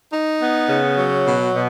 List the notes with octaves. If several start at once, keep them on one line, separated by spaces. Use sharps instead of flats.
D#4
B3
C#3
F#3
B2
B2